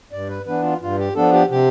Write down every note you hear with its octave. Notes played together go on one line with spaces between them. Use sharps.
G2 D5
B4
E3 B3 D4 B4
F4
G2 F4
G4
F3 B3 D4 A4
G4
C3 G4